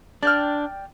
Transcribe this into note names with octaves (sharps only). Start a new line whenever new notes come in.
D4 D5 G5 F6